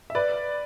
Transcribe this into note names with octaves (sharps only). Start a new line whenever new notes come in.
E5
B4 D5